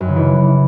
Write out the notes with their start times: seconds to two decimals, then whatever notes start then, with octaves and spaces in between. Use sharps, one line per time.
0.01 F#2
0.08 C#3
0.16 E3